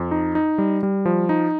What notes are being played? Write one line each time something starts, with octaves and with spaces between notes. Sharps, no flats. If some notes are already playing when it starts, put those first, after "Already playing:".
Already playing: F2
D#4
D#4
G3
G3
F3
D#4